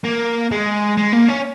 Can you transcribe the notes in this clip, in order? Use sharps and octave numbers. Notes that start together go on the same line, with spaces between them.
A#3
G#3
G#3
A#3
C#4